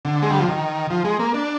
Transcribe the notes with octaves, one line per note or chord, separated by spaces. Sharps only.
D3
G#3
G3
F3
D#3
F3
G#3
A#3
D4